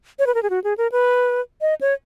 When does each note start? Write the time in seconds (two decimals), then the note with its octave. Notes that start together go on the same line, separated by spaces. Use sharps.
0.19 C#5
0.27 B4
0.35 A#4
0.43 G#4
0.50 F#4
0.64 G#4
0.78 A#4
0.92 B4
1.61 D#5
1.81 C#5